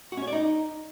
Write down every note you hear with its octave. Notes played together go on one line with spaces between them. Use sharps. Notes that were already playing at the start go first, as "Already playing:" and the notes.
F#4
C#4
C#5
D5
D#4